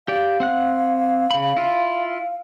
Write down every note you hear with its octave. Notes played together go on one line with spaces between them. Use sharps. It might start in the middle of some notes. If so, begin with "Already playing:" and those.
G4 D5 F5
C4 F#5 F#6
C#3 B5
E4 F4